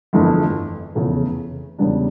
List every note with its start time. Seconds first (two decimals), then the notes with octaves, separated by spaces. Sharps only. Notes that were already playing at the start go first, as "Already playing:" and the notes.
0.13 G1 F2 E3 A3
0.95 F1 E2 C#3 E3 A3
1.79 E2 C#3 G3 D4